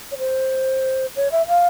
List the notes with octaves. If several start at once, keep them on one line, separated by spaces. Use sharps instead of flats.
C#5
C5
C#5
E5
F5